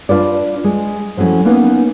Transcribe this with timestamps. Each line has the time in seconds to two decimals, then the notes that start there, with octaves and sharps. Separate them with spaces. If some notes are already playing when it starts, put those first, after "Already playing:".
0.09 D4 D#4 F4 B4 D5
0.64 G#3
1.17 F3 F#3 A3 C#4 E4
1.45 A#3 B3 C#4 D#4 B4